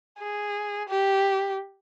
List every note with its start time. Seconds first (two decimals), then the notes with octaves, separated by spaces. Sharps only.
0.19 G#4
0.89 G4